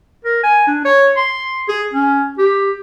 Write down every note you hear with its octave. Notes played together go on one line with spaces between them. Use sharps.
A#4
G#5
D4
C#5
C6
G#4
C#4
G4